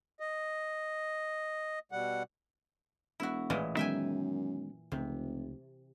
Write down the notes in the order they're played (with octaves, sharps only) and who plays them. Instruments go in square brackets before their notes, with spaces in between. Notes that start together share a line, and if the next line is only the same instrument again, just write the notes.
[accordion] D#5
B2 G3 F#5
[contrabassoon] E1 [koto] E4 F#4
[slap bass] A1 [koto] A#2 E3 G#3
[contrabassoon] F#2 [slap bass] D#3 G#3 B3 [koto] E5 G5 G#5
[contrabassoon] F1 [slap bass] C#2 [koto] C3